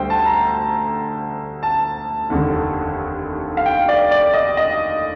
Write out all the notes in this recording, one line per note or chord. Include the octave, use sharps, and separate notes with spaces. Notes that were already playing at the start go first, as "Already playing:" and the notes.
Already playing: D2 D3 G3 C5 G5
A5
A#5
A5
F1 D#2 D3
F5
G5
D5
D5
D#5
D#5